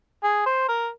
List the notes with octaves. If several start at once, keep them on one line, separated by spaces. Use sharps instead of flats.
G#4
C5
A#4